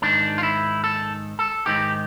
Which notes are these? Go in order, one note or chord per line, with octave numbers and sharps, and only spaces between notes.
G#2 D#3 D4
F4
E4
A4
A4
G#2 D#3 G4